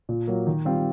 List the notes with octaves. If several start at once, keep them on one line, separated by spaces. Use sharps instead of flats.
A#2
F#3 A#3
D#3
G3 C4 F4